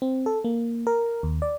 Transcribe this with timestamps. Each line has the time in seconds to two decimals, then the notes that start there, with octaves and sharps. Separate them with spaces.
0.02 C4
0.26 A4
0.44 A#3
0.87 A#4
1.23 D#2
1.42 D5